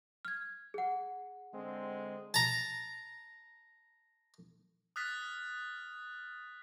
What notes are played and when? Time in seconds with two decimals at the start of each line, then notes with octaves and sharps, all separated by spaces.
0.25 F6 G#6
0.74 G#4 F#5
1.54 D3 G#3 C4
2.34 A5 A#5
4.96 D#6 F6 F#6 A6 B6